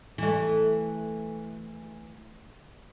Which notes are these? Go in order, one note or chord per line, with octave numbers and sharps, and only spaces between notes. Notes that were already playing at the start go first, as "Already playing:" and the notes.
E3 A3